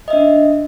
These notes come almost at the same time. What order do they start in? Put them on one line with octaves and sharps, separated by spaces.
D#5 E5 D4